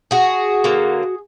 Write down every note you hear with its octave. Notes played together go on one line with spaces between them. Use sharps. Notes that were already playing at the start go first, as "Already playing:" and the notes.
F#4 G#4
D3 F#3 A#3